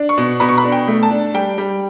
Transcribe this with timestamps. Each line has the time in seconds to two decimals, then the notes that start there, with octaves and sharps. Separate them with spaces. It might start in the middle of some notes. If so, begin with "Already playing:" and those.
Already playing: D4
0.09 C#6
0.17 B2
0.40 B2 B5
0.49 C#6
0.58 B5
0.64 D4
0.72 G5
0.88 A3
1.03 A5
1.11 D4
1.34 G3 G5
1.58 G3